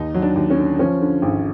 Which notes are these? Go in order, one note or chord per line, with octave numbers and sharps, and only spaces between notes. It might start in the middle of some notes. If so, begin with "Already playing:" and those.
Already playing: D#2 D#4
F#3
D4
D#2
C#4
D3
F3 C#4
D3
G#1